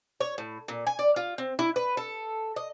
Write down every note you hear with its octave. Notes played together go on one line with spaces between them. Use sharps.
C#5
A2
A#2
G#5
D5
F4
C4
E4
B4
A4
D#5